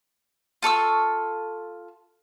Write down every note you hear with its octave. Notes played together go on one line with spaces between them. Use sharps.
F4 A4 C#6 E6